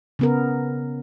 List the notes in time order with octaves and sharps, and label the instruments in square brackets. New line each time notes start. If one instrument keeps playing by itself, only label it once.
[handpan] C#3 B3 A#4